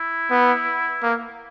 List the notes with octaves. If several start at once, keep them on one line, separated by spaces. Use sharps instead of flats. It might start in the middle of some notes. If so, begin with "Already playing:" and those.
Already playing: E4
B3
A#3